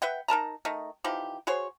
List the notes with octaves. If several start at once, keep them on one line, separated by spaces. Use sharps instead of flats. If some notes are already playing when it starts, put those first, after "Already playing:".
B4 E5 F#5 G5
D#4 A#4 A5 A#5
D#3 A3 D#4
E3 F3 D#4 G4
F#4 G#4 C5 C#5